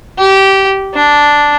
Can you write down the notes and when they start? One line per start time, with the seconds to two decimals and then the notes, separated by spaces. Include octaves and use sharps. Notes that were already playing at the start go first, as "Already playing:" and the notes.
0.19 G4
0.95 D4